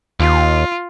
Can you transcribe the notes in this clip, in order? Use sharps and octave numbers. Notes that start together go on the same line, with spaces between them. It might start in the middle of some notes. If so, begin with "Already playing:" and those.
D#2 F4